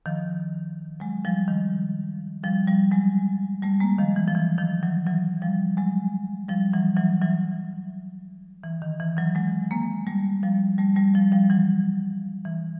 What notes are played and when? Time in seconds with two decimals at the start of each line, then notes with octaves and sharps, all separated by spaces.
0.06 D#3 F3
1.00 F#3 G#3
1.25 F3 G3
1.48 D#3
2.44 F3 G3
2.67 F3 G3
2.91 F#3 G#3
3.63 G3 A3
3.80 G#3 A#3
3.98 D#3 F3
4.16 E3
4.27 F3
4.35 E3
4.58 D#3 F3
4.83 E3 F#3
5.06 E3 F#3
5.42 F3 G3
5.77 F#3 G#3
6.49 F3 G3
6.73 E3 F#3
6.96 E3 F#3
7.21 E3 F#3
8.64 E3
8.82 D#3
9.00 E3
9.17 E3 F#3
9.35 F#3 G#3
9.71 G#3 A#3
10.07 G3 A3
10.43 F3 G3
10.78 G3 A3
10.96 G3 A3
11.14 F3 G3
11.32 F3 G3
11.50 E3 F#3
12.45 E3